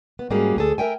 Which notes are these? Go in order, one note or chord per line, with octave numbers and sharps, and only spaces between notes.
B3
G#2 G3 A#3 C#4 F#4 G#4
D2 G#4 A4
A#4 E5 G5 G#5